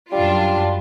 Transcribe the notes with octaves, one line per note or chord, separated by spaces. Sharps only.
F#2 G3 D4 F4